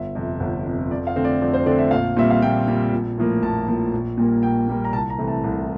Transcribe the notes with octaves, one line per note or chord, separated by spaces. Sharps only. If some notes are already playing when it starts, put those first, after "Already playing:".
Already playing: G1 E5
F2 C3
G1
F2 C3
F2 D5
F5
D3 A3 C4
D5
F2 D5
C5
D3 A3 C4 D5
E5
A#1 F5
A#2 G3 C4 E5
F5
A#1 G5
A#2 G3 C4
A#1
A2 F3 A#3
A#1 A5
A2 F3 A#3
A#1
A#2 G3 A#3
A#1 G5
A#2 G3 A#3
A#5
C2 A5
A#5
C3 E3 A3 C4
A5
C2